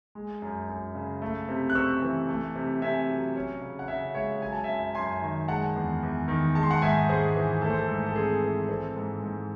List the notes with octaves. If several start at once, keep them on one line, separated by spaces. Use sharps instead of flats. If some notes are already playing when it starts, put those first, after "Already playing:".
G#3
F#2
F#2
C#3
A3
C3
F#6
C4 C#6 E6
E3
A3
C3
C3 E5 G#5
F#3
C#4
C#3
F#5
C#3 C#5 E5
G#3 C#5 E5
F#3 G#5
A5
F#2 E5 G#5
F#2 G#5 C6
D#3
G#3 F#5 A5
E2
E2
D#3
G#3 A5
C6
F#5 A5
G#2 E5 G#5
G#2 G#4 C5
E3
A3 A4
C5
A4
G#2
A4
C4 G#4
E3
C4 A4
G#2
G#2